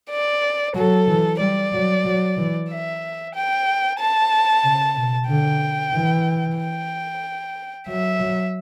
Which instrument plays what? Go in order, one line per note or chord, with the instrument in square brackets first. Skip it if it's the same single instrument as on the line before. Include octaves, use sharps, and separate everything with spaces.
[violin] D5
[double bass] F#3 [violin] A4
[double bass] E3
[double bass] G3 [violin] D5
[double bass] F#3
F#3
E3
[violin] E5
G5
A5
[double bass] C#3
B2
[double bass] D3 [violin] G5
[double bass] E3
[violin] G5
[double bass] F#3 [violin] E5
[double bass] F#3